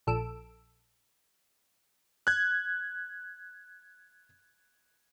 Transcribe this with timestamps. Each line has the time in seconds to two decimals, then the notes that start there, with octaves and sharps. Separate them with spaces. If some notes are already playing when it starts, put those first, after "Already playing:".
0.07 A#1 A4 E6 D7
2.27 F#6 G#6